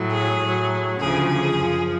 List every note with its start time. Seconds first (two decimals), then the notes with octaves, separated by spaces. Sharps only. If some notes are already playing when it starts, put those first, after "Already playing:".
Already playing: A2 F#3
0.11 G#4
0.39 A2 F#3
0.98 D2 C#3 F3 G#4
1.28 G#4
1.56 F#2 F3